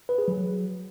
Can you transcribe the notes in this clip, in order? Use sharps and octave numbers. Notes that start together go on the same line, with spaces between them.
B4
G#4
F#3